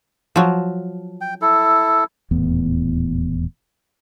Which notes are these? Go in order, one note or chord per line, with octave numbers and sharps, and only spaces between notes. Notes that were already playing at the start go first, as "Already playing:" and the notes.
F3 F#3
G5
E4 A4
D#1 E2 A2 B3